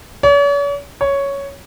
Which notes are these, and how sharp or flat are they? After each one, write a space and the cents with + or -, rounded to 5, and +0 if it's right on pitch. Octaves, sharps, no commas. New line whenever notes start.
C#5 +45
C#5 +5